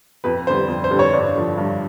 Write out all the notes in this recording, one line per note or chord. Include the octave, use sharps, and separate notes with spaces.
F2 B4
D3 G3 C5
F2
C5
D3 G3
C#5
G2 D5
D3 F3
G2